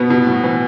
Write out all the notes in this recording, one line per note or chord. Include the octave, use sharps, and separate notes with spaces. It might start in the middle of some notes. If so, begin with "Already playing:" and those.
Already playing: B2 B3
B2
A2
E3